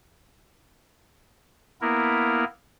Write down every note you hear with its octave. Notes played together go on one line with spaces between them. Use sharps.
A#3 B3 E4 A#4